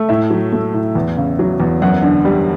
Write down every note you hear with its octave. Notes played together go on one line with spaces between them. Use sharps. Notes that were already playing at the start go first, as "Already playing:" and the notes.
Already playing: A3
A2 E5
F#3
A3
A2
E2
C#3
F#3
E2
F#2 F#5
D3
G3